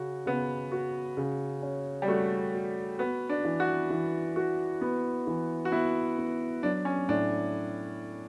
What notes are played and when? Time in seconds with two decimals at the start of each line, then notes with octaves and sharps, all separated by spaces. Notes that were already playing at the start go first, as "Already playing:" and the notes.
Already playing: C#3 F#4
0.26 C#3 B3
0.72 F#4
1.17 C#3
1.62 C#4
2.02 G3
2.08 A3 F#4
2.54 F#4
2.99 B3 F#4
3.29 D4
3.45 E3
3.60 F#4
3.90 E3
4.36 F#4
4.81 B3
5.27 E3
5.65 F#4
5.72 B3 E4
6.18 B3
6.63 F#3 D4
6.85 C#4
7.08 A2 D4